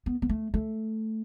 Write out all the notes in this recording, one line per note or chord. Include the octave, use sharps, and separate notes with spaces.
B3
B3
A3
A3